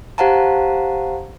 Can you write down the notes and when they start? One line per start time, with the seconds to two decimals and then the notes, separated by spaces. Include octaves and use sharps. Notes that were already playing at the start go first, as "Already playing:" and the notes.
0.18 G4 C5 F5 F#5 A5 A#5